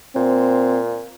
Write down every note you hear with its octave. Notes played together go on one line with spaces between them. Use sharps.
A#2 C4